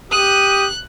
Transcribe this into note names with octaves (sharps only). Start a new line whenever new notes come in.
G4 D#6 F#6 D#7